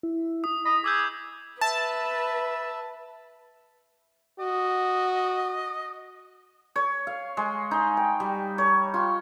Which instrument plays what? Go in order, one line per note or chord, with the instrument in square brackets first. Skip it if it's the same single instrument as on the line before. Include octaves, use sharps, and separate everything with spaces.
[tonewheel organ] E4
[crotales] D#6
[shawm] D#5 [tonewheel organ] B5
[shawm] G#4 [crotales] D6 E6 G6
[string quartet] B4 [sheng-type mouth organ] E5 [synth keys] A5
[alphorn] F#4 [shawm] D#5
[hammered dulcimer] C#5
F5
G#3
D#4
G5
G3
C#5
F4